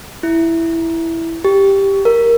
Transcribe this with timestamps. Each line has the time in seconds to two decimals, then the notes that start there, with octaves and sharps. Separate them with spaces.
0.23 E4
1.45 G4
2.05 A#4